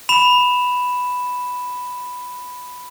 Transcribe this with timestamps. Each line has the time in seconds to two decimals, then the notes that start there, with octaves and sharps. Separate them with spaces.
0.09 B5 E7